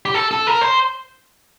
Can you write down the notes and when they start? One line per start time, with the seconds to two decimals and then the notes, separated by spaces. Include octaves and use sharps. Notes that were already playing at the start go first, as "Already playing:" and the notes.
0.05 G4
0.14 A4
0.31 A4
0.47 A#4
0.61 C5